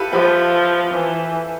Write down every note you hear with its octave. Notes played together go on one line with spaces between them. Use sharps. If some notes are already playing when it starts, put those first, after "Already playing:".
Already playing: E4 F4 G4 A4 B4
F3 G4 B4
E3